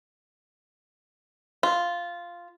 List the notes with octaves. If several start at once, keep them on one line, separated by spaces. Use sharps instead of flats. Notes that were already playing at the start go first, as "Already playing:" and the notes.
F4